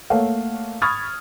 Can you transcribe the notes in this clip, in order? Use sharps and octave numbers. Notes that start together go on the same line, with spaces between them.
A3 A#3 C#5 F5 F#5
B5 C#6 D#6 F6 G#6 A6